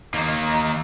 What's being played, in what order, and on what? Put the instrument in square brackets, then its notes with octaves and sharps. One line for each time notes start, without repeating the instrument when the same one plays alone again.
[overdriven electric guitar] D#2 A#3 [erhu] D#4